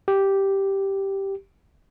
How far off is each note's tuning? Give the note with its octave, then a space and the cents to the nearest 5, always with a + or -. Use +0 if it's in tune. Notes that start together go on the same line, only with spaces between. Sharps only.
G4 -5